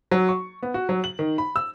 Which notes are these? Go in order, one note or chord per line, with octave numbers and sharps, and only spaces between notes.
F#3
C#6
B3
F#4
F#3
F#7
D#3
B5
E6